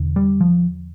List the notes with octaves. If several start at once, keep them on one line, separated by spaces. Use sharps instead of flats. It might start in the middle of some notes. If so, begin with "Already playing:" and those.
Already playing: E1 E2 D3
G3
F3